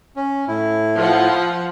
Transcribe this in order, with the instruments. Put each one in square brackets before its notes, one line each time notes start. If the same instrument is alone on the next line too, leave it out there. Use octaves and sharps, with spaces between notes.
[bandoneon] C#4
A2 E4
[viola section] F3 F4 F#5